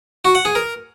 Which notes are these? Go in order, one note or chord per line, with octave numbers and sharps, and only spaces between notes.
F#4
F#5
G#4
A#4